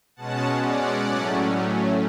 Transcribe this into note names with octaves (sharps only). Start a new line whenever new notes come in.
B2 G#3 C#4 F#5 A5
D5 F#5
A2 F#3 A3 C#4